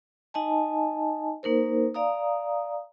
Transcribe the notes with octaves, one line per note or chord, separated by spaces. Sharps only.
D#4 D#5 G#5 A5
A#3 D#4 A#4 C5
D5 F5 A#5 D#6